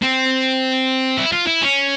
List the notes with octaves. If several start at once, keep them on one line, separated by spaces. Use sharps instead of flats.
C4
E4
F4
E4
C#4